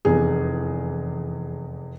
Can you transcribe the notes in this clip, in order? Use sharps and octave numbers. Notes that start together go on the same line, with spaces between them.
F1 E2 G#4